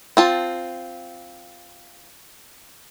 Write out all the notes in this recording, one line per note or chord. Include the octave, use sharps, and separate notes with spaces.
C4 F4 A5